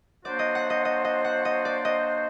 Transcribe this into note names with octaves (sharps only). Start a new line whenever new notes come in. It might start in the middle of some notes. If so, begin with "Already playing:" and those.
F#3 A#3 D4 F#4 C5 D5
D#5
F#5
D#5
D#5
D#5
F#5
D#5
D5
D#5